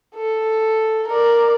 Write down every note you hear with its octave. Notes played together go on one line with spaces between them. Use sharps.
A4
A#4 D5